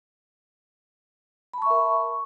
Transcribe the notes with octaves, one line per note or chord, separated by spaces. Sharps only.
A#4 E5 A5 B5 C#6